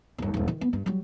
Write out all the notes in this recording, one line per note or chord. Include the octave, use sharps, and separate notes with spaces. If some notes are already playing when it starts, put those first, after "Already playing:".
G1 D#2
D#1 G2
D#3 E3
B3
G2
F#3 G3